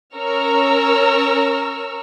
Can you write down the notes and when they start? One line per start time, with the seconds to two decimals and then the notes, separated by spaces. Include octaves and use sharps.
0.16 C#4 A#4 A#5 C#6 E6 F6